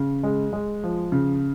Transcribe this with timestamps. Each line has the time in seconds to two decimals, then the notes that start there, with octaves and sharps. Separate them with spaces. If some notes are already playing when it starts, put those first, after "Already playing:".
Already playing: C#3
0.23 G#3
0.53 G#3
0.83 F3
1.12 C#3